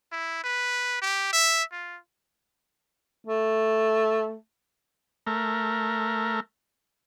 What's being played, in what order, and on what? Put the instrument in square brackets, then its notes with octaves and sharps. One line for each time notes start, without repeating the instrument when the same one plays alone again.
[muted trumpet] E4
B4
G4
E5
F4
[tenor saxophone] A3
[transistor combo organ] A3 A#4